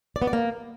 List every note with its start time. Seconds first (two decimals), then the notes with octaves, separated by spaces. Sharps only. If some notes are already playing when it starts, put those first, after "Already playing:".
0.16 D5
0.22 B3
0.27 D5
0.33 A#3